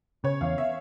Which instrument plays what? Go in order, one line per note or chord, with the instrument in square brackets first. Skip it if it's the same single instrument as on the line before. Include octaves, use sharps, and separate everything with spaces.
[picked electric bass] C#3 [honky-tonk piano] C#5
[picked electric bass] E2 [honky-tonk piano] F5
[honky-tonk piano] E5